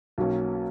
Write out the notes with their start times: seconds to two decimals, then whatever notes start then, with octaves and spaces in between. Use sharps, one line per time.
0.18 B1 B2 F#3 A#3 C#4